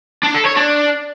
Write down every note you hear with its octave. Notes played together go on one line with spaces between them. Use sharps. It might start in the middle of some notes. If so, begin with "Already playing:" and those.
D4
A4
C#5
D4